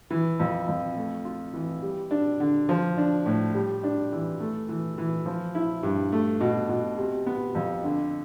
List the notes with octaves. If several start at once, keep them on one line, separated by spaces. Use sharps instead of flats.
E3
F2
F2
A3
F4
E3
G3
D4
D3
F3
D4
A2
G3
D4
E3
A3
E3
E3
F3
E4
G2
A3
B2
B2
C3
B3
F2
D3